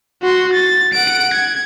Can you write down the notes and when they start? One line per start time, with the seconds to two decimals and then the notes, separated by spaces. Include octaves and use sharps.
0.23 F#4 C6
0.53 A6
0.93 F#5 D7
1.34 G#6